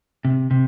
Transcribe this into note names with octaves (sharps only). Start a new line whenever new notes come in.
C3
C3